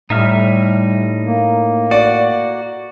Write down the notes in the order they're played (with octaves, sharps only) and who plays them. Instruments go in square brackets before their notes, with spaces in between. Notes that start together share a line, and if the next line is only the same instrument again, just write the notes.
[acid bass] A2 [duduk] G3 [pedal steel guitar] D#4 E5 F6
[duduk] A#3
[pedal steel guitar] F#4 [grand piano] D5